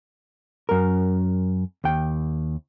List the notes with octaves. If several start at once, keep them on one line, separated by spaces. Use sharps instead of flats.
F#2 A#4
D#2 G5